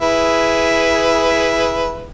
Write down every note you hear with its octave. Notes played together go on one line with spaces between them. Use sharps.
E4 G#4 B4